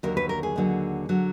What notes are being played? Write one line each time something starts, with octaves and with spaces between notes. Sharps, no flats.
D#2 D3 F#3 A#4
B4
A#4
G#4
D#2 D3 F#3
D3 F#3